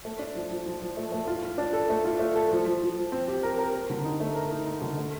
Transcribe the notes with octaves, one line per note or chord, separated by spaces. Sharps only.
A3
D4
F3
F3
F3
F3
A3
A3
F4
F4
D4
A4
A3
F4
A3
A4
F3
F3
F3
F3
C4
G4
A#4
A#4
A#4
D3
D#4
A3
A#4
D#4
D#4
D3
A3